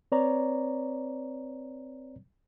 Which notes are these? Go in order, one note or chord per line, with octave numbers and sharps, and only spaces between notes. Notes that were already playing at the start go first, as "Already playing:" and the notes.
C4 B4 C#5 D5 A#5